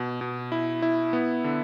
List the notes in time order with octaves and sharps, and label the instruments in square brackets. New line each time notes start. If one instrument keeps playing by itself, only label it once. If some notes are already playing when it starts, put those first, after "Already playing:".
Already playing: [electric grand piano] B2
B2
E4
E4
B3
D3